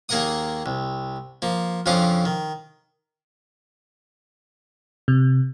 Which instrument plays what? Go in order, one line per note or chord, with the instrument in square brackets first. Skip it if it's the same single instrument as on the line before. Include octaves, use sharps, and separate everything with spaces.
[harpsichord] D#2 A#3 G#4 A#4 F#5 D#6
C2
F3 A#3
F2 C#3 F3 D4 F5 D#6
D#3
[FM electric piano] C3